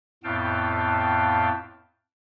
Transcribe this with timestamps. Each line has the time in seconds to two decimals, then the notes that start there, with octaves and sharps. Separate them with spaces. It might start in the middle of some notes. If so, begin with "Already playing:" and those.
0.24 F2 A2 B3 F5 G5 A5